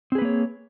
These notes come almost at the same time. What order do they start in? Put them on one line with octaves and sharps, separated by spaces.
C4 G#4 B4 A#3 C#5